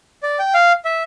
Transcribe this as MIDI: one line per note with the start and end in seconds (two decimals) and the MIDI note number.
0.23 0.38 74
0.39 0.54 79
0.54 0.73 77
0.85 1.03 76